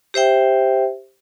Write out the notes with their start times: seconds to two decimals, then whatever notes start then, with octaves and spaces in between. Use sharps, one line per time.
0.14 G4 C5 E5 G5